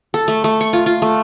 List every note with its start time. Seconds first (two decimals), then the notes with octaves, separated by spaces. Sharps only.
0.14 A4
0.28 A3
0.44 A3
0.61 C#6
0.73 F4
0.86 F4
1.02 A3